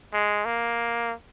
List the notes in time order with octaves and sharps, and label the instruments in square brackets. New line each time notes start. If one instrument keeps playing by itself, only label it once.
[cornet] G#3
A#3